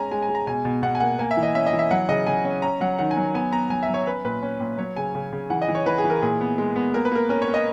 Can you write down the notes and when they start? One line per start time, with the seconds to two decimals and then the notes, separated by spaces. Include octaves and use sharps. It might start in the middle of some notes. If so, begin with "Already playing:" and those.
Already playing: G#3 C#4 G#5 A#5
0.11 G#3 G#5
0.22 G#5
0.29 G#3
0.35 A#5
0.47 B2 G#5
0.65 B2
0.83 B2 F#5
0.95 G#5
1.00 A#3 F#5
1.19 A#3 G#5
1.31 E5
1.37 E3
1.43 D#5
1.55 C#4 E5
1.67 D#5
1.73 E3
1.79 E5
1.91 F#3 F#5
2.09 C#3 D#5
2.27 C#3 G#5
2.45 C#4
2.62 C#4 A#5
2.81 F#3 F#5
2.98 D#3 F#5
3.11 G#5
3.17 F#3
3.34 B3 G#5
3.52 B3 A#5
3.70 F#3 G#5
3.83 E5
3.88 F#3
3.94 C#5
4.07 C#4 B4
4.24 A#2 B4
4.43 C#4
4.60 A#2
4.78 F#3 C#5
4.96 C#3 G#5
5.15 C#3
5.33 C#3
5.50 E3 F#5
5.62 D#5
5.68 E3
5.75 C#5
5.86 E3 B4
5.98 G#4
6.04 E3
6.10 A#4
6.22 A#2 G#4
6.41 B3
6.58 G#3
6.76 B3
6.94 A#3 A#4
7.05 B4
7.12 A#3 A#4
7.29 C#4 A#4
7.42 C#5
7.48 C#4
7.54 D#5